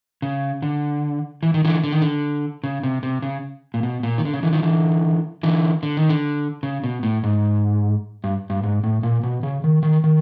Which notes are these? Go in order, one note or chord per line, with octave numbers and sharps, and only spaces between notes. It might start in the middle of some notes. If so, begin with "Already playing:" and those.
C#3
D3
E3
D#3
D3 E3
D3
D#3
D3
C#3
C3
C3
C#3
A#2
B2
A#2
D#3
D3
C#3
D3 E3
D#3 F3
D3 E3
D3 E3
D3
D#3
D3
C#3
B2
A2
G#2
G2
G2
G#2
A2
A#2
B2
C#3
D#3
D#3
D#3